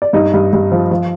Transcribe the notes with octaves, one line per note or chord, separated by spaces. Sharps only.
D5
G2 D#4 D#5
G2
G2
F3
F3